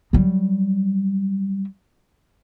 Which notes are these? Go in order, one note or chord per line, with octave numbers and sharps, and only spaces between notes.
F#3 G3